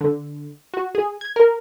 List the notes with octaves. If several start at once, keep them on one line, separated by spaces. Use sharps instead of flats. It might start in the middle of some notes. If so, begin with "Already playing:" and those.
D3
F#4
G#4
G#6
A#4